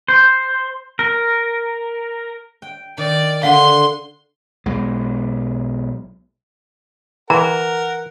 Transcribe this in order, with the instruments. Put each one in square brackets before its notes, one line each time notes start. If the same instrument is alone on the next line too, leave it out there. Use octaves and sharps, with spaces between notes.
[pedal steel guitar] C5
A#4
[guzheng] G5
[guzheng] D#3 [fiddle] D5
[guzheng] D3 [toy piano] F5 F#5 [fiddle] C6
[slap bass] B1 G#3
[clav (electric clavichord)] E3 [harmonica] A#4 F#5 [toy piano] A#5